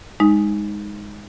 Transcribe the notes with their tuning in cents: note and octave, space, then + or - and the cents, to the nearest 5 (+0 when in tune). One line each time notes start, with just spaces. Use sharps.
G#3 -15 D#4 +0